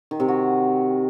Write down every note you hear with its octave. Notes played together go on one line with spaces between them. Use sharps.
D#3
C3
F#4